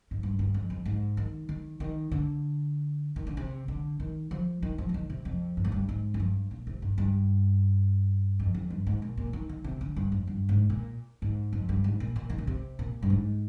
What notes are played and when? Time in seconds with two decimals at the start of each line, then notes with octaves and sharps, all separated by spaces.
0.11 G#2
0.23 G2
0.39 G2
0.54 F2
0.70 F2
0.85 G#2
1.17 D#3
1.49 D#3
1.80 D#3
2.12 D3
3.16 D#3
3.27 D3
3.37 C3
3.68 D3
4.00 D#3
4.31 F3
4.62 D#3
4.78 F3
4.89 D3
4.94 D#3
5.10 C3
5.25 F2
5.57 G2
5.65 G#2
5.72 G2
5.89 G#2
6.14 F2
6.20 G2
6.51 A#2
6.67 C3
6.82 G2
6.98 G2
8.40 F2
8.55 F2
8.70 G2
8.87 G#2
9.02 A#2
9.17 A#2
9.33 D#3
9.49 D#3
9.64 C3
9.81 D3
9.96 G2
10.12 F2
10.27 G2
10.49 G#2
10.70 A#2
11.22 G#2
11.53 F2
11.69 G2
11.84 G#2
12.00 A#2
12.16 A#2
12.30 D#3
12.38 D3
12.47 C3
12.79 A#2
13.03 G2
13.10 G#2